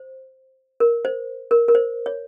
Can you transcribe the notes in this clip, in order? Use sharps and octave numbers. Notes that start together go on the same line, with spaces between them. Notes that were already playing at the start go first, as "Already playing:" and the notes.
Already playing: C5
A#4
C5
A#4
A#4
C5
C#5